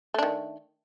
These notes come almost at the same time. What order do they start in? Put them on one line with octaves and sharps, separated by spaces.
A3 D4 D#3